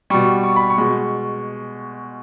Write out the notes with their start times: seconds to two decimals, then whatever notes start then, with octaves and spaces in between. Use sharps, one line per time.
0.10 B2 G3 C#6
0.44 C#6
0.56 B5
0.70 C#6
0.78 B2 G#3